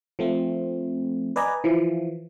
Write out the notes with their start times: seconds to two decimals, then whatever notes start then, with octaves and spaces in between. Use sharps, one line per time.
0.19 F3 A3 C4
1.36 B4 D5 D#5 G#5 A#5
1.64 E3 F3